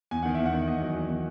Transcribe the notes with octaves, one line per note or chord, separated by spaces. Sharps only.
E2 G#5
D#3 F#5
E2 E5
F#5
D#3
E2 D#5
F#3
E2
D#3